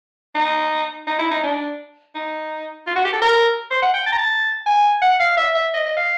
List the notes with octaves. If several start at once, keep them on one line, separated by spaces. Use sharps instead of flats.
D#4
D#4
E4
D#4
D4
D#4
F4
F#4
G4
A4
A#4
C5
F#5
G5
A5
A#5
A5
G#5
F#5
F5
E5
E5
D#5
D#5
F5